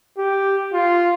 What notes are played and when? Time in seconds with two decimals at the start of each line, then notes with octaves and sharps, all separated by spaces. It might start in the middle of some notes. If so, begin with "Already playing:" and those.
0.18 G4
0.74 F4